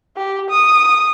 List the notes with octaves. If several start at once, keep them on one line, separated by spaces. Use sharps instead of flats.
G4
D#6